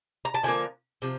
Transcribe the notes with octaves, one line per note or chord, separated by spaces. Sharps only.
A#5
A5
D3 F3 A#3 G#5
C3 F3